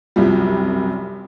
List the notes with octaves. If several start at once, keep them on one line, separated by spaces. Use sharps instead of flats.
C2 F#2 F3 G3